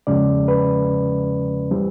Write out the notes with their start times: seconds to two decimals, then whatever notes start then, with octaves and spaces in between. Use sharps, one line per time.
0.07 E2 C#3 F3 G#3 C#4 D5
0.48 B4
1.71 E3 G3 C4